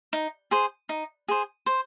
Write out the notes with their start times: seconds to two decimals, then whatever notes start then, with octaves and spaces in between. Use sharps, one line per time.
0.13 D#4
0.51 G#4 C5
0.89 D#4
1.28 G#4 C5
1.66 C5